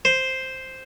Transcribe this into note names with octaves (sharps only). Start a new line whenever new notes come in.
C5